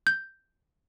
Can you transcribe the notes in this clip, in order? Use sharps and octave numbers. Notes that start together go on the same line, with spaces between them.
G6